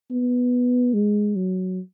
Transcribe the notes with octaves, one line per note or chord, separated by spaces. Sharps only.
B3
G#3
F#3